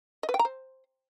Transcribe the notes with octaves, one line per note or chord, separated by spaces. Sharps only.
D#5
B4
G5
A#5
C5